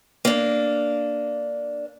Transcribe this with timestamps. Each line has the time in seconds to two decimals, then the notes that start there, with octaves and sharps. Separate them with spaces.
0.25 A#3 D4